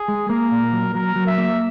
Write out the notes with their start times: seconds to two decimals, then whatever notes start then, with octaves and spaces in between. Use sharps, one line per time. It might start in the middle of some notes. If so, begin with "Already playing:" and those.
Already playing: G#4
0.08 G#3
0.29 A#3 A#4
0.51 A#2
0.72 F#3
0.94 F#3 A#4
1.16 F#3
1.27 E5
1.38 A#3